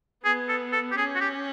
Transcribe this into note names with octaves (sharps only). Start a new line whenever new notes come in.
B3 G#4
A4
A4
G4
C#4 G#4
F#4
G4